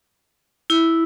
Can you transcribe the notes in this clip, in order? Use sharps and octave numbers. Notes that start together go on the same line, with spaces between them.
E4